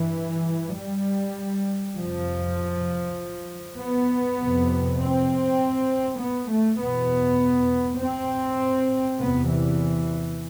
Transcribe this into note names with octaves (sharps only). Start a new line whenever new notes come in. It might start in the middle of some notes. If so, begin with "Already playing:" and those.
Already playing: G2 E3
G3
F2 C3 F3
B3
F2 C3
C4
B3
A3
E2 B2 B3
C4
E2 C3 B3
E3